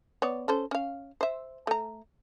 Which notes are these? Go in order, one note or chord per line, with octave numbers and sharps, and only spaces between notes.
B3 C#5 D5
C#4 A4 C5
C#4 F5
C5 E5
A3 A#5